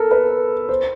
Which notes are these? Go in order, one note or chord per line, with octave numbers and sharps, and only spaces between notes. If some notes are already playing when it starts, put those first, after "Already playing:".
Already playing: A4 A#4
B4
C5